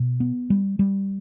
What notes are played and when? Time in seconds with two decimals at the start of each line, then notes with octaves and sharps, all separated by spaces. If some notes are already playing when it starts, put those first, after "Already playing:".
Already playing: B2
0.20 B3
0.50 G3
0.79 G3